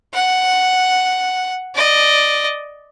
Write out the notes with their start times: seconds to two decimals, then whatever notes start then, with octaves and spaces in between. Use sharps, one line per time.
0.13 F#5
1.75 D5 D#5